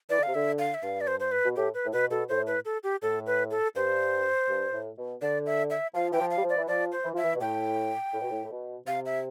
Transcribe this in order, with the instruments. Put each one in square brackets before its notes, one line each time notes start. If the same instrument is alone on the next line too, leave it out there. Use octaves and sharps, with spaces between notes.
[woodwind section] E3 [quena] D5
[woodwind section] D3
[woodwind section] C3 [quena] F5
[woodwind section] D3 [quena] E5
[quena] F5
E5
[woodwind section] G2 [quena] F5
[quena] D5
C5
C5
B4
[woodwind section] B2
[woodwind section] A2 [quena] G4
[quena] B4
[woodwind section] A2
[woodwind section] B2 [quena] B4
[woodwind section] B2 [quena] A4
[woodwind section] A2 [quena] C5
[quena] B4
A4
G4
[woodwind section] A2 [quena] A4
[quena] B4
A4
[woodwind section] G2 [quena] C5
[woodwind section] G2
A2
B2
[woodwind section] D3 [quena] D5
[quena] E5
E5
[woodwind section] F3 [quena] F5
[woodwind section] E3 [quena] G5
[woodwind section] F3
[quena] F5
[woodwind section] G3
F3
[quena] D5
[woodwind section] E3
[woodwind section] F3 [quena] D5
[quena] C5
[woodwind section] E3
[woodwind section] F3 [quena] E5
[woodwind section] E3
B2
[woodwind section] A2 [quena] G5
[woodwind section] A2
B2
A2
A2
B2
[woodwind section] C3 [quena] F5
[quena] E5